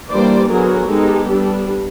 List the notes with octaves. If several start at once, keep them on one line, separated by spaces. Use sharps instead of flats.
E3 G3 A#3 D4 C5 D5
D3 F#3 B3 G#4 A#4
G#3 B3 D#4 G4 A4
G3 B3 D4